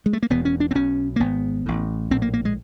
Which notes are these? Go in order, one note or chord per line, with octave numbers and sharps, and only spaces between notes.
G#3
A3
A#3
E1 E2 B2 B3
C#4
D4
C4
B1 B2 C#4
A#3
G#1 G#2 B3
A1 A2
A#1 A2 C4
A#3
A#3
G#3